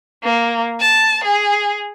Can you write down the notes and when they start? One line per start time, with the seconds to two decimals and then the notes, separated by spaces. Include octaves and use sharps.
0.24 A#3
0.80 A5
1.24 G#4